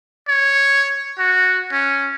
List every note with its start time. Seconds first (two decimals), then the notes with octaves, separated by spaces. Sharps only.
0.28 C#5
1.19 F#4
1.72 C#4